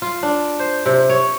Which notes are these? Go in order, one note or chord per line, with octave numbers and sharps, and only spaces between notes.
F4
D4
C5
C3
C#5